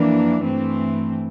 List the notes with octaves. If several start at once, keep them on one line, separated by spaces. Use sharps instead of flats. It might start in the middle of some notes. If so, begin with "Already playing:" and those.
Already playing: F2 E3 A#3 D4
G2 E3 A3 C4